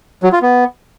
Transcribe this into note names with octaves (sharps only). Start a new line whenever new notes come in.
F#3
F4
B3